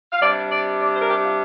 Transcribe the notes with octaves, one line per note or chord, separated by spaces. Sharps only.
F5
C3 G3 D4 D5
D5
D5
C5
A#4
G4
F4